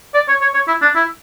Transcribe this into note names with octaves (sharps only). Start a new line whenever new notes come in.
D5
C#5
C#5
C#5
E4
D4
E4